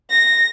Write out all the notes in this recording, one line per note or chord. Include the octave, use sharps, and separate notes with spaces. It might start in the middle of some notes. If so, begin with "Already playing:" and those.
A#6